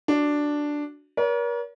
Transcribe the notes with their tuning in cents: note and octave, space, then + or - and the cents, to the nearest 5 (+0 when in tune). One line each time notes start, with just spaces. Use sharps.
D4 +0 F#4 +0
A#4 +40 C#5 +45